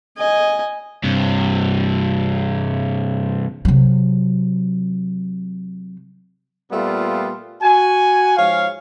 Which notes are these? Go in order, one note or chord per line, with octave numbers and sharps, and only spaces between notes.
D#5 G#5
G2 C3
C3 F#3
A#2 G3 A3 B3 F4
F#4 G#5
G#2 F3 C#5 F5